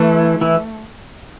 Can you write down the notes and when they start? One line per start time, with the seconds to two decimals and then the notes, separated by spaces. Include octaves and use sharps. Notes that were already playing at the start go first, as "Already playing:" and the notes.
Already playing: E3 A3 E4
0.41 E3 E4